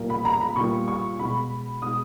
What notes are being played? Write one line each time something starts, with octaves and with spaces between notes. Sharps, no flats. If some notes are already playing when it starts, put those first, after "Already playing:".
Already playing: A#2 G3 A#3
B5
A#5
B5
A#2 G3 A#3 C#6
C#6
B2 G#3 B5
B2 G#3 D#6